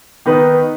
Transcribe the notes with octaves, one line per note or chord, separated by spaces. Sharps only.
D#3 B3 D#4 B4